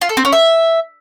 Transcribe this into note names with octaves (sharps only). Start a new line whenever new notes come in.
F4
A4
C4
C#4
E5